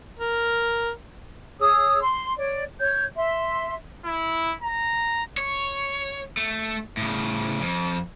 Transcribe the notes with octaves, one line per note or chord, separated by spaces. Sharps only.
A#4
G#4 C#5 D#6 E6
C6
C#5 D5
C#5 G6 G#6
E5 C6
E4
A#5
C#5
A3
A2 C#3
F2